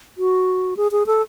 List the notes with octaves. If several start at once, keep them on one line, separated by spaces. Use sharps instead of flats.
F#4
G#4
G#4
A4